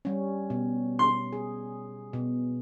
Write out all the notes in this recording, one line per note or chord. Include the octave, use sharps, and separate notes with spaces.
G3 C#4
B2
C6
G#4
B2